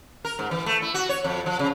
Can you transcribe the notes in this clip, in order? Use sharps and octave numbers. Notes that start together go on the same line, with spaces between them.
A#4
G#2
E3
A3
E4
F#4
C#5
F2
F3
C#3